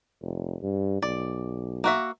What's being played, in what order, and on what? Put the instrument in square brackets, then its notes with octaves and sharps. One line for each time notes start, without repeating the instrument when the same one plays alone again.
[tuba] F1
G2
[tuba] B1 [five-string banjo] D5
[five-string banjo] A#3 F#4 E5